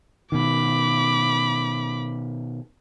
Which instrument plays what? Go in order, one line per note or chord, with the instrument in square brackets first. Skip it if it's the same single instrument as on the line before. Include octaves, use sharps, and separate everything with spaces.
[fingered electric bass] B2 D#3 [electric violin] B5 D6